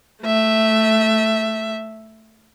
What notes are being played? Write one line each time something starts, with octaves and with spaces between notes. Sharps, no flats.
A3 E5